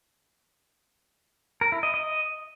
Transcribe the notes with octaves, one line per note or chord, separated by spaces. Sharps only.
A#4
E4
D#5
D#5